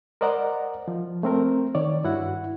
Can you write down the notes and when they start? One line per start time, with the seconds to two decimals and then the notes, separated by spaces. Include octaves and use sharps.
0.21 A#4 C5 D5 D#5 F#5 A#5
0.88 F3
1.23 A3 C4 A#4
1.75 D#3 C#5 D5
2.04 G2 E4 F#4 F#5